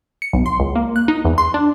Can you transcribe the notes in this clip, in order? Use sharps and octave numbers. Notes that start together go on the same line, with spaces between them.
C#7
B1
C6
C#2
A#3
F#6
D#4
E2
C6
D4